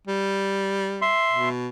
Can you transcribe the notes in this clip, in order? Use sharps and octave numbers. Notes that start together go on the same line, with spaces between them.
G3
E5 C6
B2